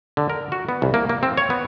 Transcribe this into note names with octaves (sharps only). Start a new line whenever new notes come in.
D3
A#4
F#4
B3
C2
A#3
A#3
C4
C#5
B3